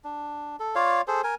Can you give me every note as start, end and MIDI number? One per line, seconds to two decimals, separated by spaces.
0.04 0.56 62
0.60 0.75 69
0.75 1.02 65
0.75 1.02 73
0.75 1.02 74
0.75 1.02 77
1.07 1.21 68
1.07 1.21 69
1.07 1.21 72
1.24 1.35 70
1.24 1.35 80